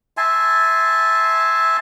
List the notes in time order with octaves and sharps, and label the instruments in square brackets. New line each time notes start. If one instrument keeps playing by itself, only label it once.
[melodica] E5 G#5 A5 C6